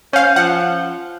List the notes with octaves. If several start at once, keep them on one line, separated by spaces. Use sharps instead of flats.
C#4 C5 F5
F3 F#5